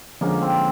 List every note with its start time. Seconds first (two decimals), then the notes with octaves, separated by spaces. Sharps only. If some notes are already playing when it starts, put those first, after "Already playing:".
0.21 D3 F3 G#3 A#3 C#4
0.42 C4